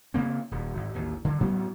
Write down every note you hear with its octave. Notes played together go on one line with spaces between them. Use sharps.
C#3 A#3 C4
D#1
G#1
A1 D#2
D3
A2 F#3 B3 C#4